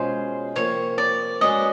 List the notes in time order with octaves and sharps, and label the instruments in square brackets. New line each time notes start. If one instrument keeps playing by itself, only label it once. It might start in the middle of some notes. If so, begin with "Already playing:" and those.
Already playing: [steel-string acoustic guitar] B2 G#3 C#4 F4 [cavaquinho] C5
[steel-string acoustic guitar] C3 F3 A#3 [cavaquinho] C#5
[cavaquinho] D5
[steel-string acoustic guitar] G#3 C#4 F#4 B4 D5 [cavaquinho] D#5